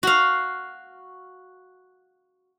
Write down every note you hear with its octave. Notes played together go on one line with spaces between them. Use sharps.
F#4 F5